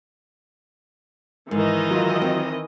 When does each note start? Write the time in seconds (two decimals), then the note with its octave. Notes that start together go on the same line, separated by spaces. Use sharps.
1.51 G#2 D#3 E3 D#5
1.91 F#3 F4
2.21 C4